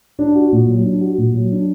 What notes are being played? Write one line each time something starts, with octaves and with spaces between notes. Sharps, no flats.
D4
F#4
A#2
F#3
D4
F#4
A#2
F#3
D4